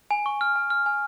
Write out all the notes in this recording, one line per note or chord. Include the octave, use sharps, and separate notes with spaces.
G#5
C#6
F6
G#5
F6
G#5